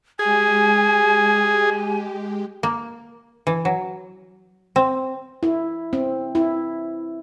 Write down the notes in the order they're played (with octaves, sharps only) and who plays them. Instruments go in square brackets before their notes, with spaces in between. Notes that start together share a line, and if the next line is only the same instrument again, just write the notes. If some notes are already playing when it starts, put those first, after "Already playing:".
[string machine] G#3 G4 [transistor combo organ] G#4 [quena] G#5
[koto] A#3
E3
F#3
C4
[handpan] E4
C4
E4